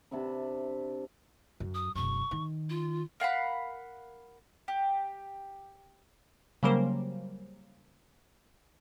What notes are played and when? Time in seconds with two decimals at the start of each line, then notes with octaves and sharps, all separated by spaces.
0.11 C3 D4 E5 B5
1.60 F#2
1.75 D#6
1.95 E1 F#2 C#6
2.31 D#3
2.70 F4
3.20 A#4 F5 F#5 B5
4.68 G4
6.63 C#3 F#3 G3 A#3 A#4 C5